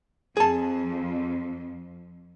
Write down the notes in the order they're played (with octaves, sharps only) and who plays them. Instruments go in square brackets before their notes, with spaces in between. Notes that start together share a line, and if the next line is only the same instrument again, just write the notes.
[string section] F2 [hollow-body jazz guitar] G#4 A5